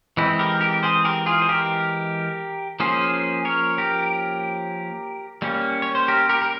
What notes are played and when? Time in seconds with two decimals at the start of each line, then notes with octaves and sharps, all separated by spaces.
0.17 E3 G#3 C4 E4
0.39 G4 A#4
0.61 G4 A#4
0.83 G#4 C5
1.05 G4 A#4
1.26 F4 G#4
1.42 C5
1.49 G4 A#4
2.80 F3 A#3 C#4 G#4 C5
3.45 A#4 C#5
3.78 G4 A#4
5.42 G3 A#3 C#4
5.82 C#5
5.95 C5
6.08 G4 A#4
6.29 G4 A#4
6.42 A#4